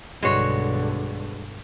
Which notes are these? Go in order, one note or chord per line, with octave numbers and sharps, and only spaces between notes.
B1 G2 D3 G#3 F#4 C#5